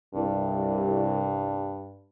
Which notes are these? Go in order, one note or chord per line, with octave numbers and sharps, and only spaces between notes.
C2 G2